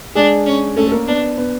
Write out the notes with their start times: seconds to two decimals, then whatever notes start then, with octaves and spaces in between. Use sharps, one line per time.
0.15 G#3 D4 G#4
0.46 C#4
0.77 A3 C#4 A4
0.88 A4
0.92 A#3 A#4
1.07 B3 D4 B4
1.38 B3 B4